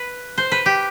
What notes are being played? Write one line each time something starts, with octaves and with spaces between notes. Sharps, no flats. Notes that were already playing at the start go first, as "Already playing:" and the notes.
Already playing: B4
C5
B4
G4